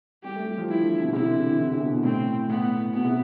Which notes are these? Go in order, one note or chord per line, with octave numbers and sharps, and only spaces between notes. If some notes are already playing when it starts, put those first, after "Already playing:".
G3 G4
A3
G3
F3
E3 E4
D3
B2
C3 E4
D3
E3
E3
D3
C3
B2
B2
A2 C4
A2 B3
B2 B3
C3